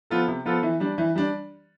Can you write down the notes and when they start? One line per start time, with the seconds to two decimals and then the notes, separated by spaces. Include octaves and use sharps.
0.10 F3 B3 F4 A4
0.28 C3
0.45 F3 B3 F4 A4
0.63 E3
0.80 G3 D4
0.98 E3
1.16 G3 D4